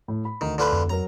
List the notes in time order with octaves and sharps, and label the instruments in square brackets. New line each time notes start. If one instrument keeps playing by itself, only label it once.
[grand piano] A2
B5
[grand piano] D2 [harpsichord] D#3
[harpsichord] D3 F4 B4
[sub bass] F2
[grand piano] F#3 A#4 [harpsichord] A#5